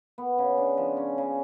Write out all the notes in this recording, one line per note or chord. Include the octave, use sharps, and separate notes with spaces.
B3
C#3
D4
F3
C#4
C#3